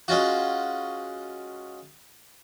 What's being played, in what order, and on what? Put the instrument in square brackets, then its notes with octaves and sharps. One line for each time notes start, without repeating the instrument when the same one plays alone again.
[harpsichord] G#3 C#4 F4 F#4